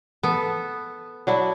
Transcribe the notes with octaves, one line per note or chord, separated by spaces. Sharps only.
B3 A4
F#3 D4 E4